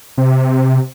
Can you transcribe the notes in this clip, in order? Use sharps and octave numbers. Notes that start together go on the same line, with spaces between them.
C3